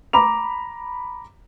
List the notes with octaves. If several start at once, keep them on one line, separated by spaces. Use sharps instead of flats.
A#5 B5 D6 F7